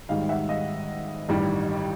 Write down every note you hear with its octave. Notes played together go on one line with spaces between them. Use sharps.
G#1 G#2 D#3 G3 D#5 F5
E5 F#5
D#5 F5
A1 G2 D#3 G3